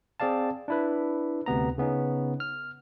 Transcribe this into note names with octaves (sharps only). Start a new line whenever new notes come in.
C4 G#4 D5 F5 A5
D4 E4 B4
D2 C3 B3 A#5
C#3 B3 C#4 D#4
F6